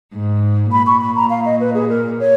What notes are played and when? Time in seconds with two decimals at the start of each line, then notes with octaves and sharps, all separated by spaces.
0.13 G#2
0.71 A#2 B5
0.87 C#6
1.01 B5
1.16 A#5
1.30 F5
1.45 D#5
1.60 B4
1.74 G#4
1.90 A#4
2.20 C#5